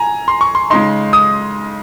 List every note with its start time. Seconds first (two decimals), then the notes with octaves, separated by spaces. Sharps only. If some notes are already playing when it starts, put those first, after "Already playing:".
Already playing: G#5 A#5
0.28 C6
0.41 C#6
0.55 C6
0.70 C#3 G#3 D#4 C6
1.13 D#6